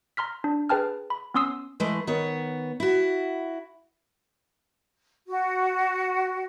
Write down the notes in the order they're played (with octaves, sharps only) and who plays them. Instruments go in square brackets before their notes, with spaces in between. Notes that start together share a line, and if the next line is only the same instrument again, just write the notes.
[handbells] A#5 C6 F6 B6
D4
G#4 B4 G5 A5 F6
B5
B3 C#4 C6 D#6 E6 C7
[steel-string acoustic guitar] E3 G#3 A3 E4
D#3 B3 C#5
E4 F#4
[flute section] F#4